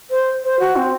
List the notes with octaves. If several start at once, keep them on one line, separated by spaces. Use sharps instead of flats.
C5
C5
F#4
C4